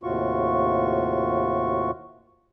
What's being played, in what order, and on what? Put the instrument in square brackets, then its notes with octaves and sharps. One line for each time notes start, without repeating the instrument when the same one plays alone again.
[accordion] D#2 A2 C3 F4 F#4 C#6